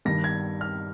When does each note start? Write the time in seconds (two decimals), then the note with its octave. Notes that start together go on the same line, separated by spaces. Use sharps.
0.05 G2 D#3 A#6
0.24 G#6
0.61 F6